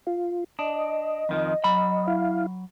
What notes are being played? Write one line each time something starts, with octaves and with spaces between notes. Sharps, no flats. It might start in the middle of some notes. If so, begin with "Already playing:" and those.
F4
D4 D#5
F2 D#3 F3
F#3 B5
E4 F5